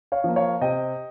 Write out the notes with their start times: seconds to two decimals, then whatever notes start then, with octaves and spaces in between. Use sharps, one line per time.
0.12 C#5 F5
0.24 F3 A#3
0.36 C#5 F5
0.61 C3 D#5 G5